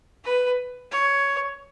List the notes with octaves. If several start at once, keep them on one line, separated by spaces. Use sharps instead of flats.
B4
C#5